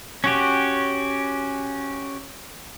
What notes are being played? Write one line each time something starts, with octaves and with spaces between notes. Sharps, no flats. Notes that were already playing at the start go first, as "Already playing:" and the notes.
C#4 F#4 G4